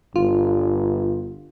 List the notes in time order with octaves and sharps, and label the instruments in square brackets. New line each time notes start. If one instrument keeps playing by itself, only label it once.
[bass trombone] G1 [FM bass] F4